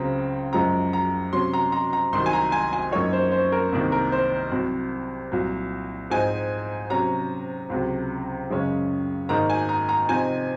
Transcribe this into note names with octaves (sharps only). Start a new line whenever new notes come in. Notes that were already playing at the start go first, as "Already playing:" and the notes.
Already playing: C#2 C#3 F#3 C4 A#5
F#2 F3 G#3 A#5
A#5
C3 F#3 C#4 C6
A#5
A#5
A#5
C2 C3 D#3 F#3 C6
G#5
A#5
G#5
G#5
F#2 F3 A#3 D#4 C#5
C5
C5
A#4
C2 C3 D#3 A#3
A#4
C5
C2 C3 F#3
C2 A#2 F#3
G#2 F3 C4 D#4 G#5
C3 F#3 C#4 A#5
C#2 C3 F#3
F#2 C#3 G#3 C#4
G#2 D#3 A#3 D#4 A#5
G#5
A#5
A#5
C3 F3 C4 D#4 G#5